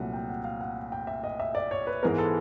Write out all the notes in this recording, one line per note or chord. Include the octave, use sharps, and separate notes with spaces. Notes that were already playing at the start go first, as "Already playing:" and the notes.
Already playing: C2 A#2 F#3 A3 F#5
G5
F#5
F5
F#5
G5
E5
D#5
E5
D5
C#5
B4
G#2 E3 G#3 B3 A#4
A4